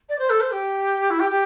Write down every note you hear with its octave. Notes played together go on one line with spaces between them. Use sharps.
D5
C5
A4
C5
G4
E4
G4
G4